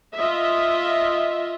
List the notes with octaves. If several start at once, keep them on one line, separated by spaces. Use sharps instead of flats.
F4 D#5 E5